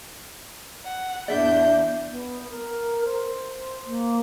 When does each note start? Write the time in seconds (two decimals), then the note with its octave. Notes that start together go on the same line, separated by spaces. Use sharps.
0.84 F#5
1.28 E2 D4 D5 E5 G6
2.09 B3
2.49 A#4
3.05 C5
3.85 A#3